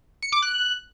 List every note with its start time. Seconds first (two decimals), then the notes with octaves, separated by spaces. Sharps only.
0.23 C#7
0.32 D6
0.42 F#6